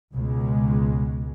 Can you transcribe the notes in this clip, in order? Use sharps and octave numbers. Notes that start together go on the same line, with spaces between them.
C#2 B2 G#3